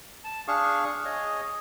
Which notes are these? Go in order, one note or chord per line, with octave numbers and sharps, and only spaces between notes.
A5
D4 G#4 F5 C#6
G#4 C#5 D#5